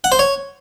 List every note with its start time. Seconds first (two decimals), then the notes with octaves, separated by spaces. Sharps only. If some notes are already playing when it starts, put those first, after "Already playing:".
0.04 F#5
0.12 C5
0.19 C#5